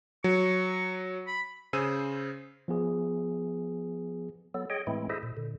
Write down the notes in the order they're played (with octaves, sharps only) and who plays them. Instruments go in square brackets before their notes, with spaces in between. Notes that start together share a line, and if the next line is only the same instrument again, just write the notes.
[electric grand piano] F#3 [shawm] C#6
[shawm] B5
[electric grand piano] C#3 G#4 C5 E6 D#7
[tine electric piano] F3 B3 G#4
[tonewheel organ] F#3 B3 A4
G#4 C#5 D#5 G5
A2 E3 G#3 A3 C4 E4
E4 G#4 A4 C5 D#5 E5
A#2
A#2 D3